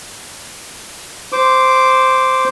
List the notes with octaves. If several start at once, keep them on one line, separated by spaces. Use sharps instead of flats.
C5 D6